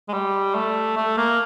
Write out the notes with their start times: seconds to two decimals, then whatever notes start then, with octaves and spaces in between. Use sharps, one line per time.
0.09 G#3
0.13 G3
0.55 A3
0.97 A3
1.17 A#3